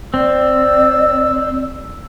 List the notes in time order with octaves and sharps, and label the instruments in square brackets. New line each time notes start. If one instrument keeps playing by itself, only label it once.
[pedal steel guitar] C4 [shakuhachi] D5 [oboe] E6